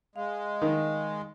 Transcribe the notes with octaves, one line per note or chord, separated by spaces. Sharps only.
G#3 F5
D#3